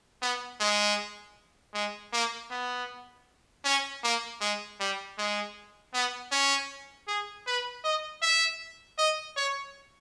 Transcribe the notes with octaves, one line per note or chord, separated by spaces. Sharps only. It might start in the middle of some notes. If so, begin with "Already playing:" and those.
B3
G#3
G#3
A#3
B3
C#4
A#3
G#3
G3
G#3
B3
C#4
G#4
B4
D#5
E5
D#5
C#5